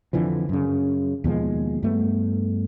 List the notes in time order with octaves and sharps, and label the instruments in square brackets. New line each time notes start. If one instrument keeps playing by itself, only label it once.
[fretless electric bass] F2 D3 E3 F3
F#2 C#3
D#2 B2 F3 G#3
G2 A3 B3